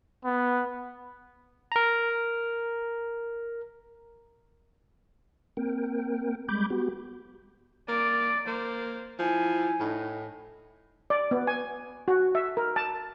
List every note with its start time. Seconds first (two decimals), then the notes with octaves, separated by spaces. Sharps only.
0.24 B3
1.72 A#4 A#5
5.57 A#3 C4 A#4 G5
6.48 G3 G#3 B5 D6 G6
6.70 B3 F#4 G4
7.88 A#3 D5
8.47 A#3 C5
9.19 F3 E4 G#5
9.80 A2 D#4
11.10 D5
11.31 B3
11.47 G#5
12.08 F#4
12.35 E5
12.57 A#4
12.76 A5